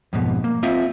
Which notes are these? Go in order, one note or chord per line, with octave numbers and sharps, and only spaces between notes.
F2 G#2 B2
A#3
C4 F4 D#5 E5